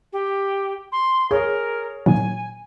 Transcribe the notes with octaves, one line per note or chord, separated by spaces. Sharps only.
G4
C6
G#4 A#4 C#5
A#2 D#3 F#3 G#5